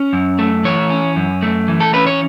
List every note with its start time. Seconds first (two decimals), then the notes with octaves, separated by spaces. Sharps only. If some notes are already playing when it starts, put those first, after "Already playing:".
Already playing: C#4
0.13 F#2
0.39 A3
0.65 E3 C#5
0.90 C#4
1.16 F#2
1.42 A3
1.68 E3
1.80 A4
1.93 C#4 B4
2.07 C#5